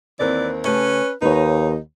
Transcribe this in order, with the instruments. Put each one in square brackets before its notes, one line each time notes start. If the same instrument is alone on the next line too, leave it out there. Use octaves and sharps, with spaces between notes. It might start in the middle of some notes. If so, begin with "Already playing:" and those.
[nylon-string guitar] D#2 C4 A#4 [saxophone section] E3 B4 D5
[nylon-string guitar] C#3 A3 G4 [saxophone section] C#4 B4
[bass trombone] D#2 [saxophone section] D#4 [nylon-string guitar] B4 C#5